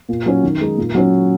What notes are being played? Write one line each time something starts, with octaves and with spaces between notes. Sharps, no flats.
A#2
F#3 C#4 F#4
D#3
G#3 D#4
A#2
F#3 C#4